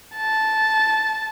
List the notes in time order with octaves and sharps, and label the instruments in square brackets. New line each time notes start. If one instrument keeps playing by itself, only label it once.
[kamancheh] A5